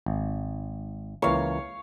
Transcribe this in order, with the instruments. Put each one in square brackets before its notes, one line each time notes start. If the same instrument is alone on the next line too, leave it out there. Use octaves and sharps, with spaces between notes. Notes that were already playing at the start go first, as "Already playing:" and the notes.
[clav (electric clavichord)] G#1
[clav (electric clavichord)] C#2 E3 A#3 [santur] C#5 F5